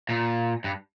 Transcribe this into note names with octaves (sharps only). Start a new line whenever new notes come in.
A#2
G2